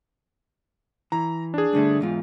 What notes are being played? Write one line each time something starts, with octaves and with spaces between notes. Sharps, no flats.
E3 A#5
D4 G#4
G2 D3 A3
E2 G#2 F4